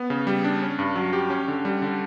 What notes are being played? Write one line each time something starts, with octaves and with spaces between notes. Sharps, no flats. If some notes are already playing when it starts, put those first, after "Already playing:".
Already playing: B3
C#3
G3
D4
C#4
G2
F#3
G4
C#4
D3
G3
D3